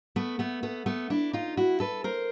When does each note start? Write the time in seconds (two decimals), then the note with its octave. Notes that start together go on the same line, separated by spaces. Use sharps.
0.16 A3 B3
0.39 A3 B3
0.63 A3 B3
0.86 A3 B3
1.10 D4 E4
1.33 D#4 F4
1.57 E4 F#4
1.80 A4 B4
2.04 A#4 C5